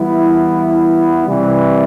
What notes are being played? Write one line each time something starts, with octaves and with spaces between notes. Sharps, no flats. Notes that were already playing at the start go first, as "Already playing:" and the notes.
Already playing: E3 G3 B3 E4
C3 E3 G3